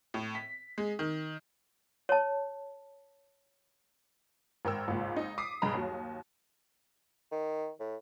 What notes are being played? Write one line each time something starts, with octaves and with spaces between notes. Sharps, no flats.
A2
B6
G#3
D#3
C#5 A5
G#1 A#4 G5 E6
G#1 C#2 A#2
D#4
D6 D#6 B6 C7
B1 G2 G#4 D#5 A#5 B5
D#2 F#3
D#3
A2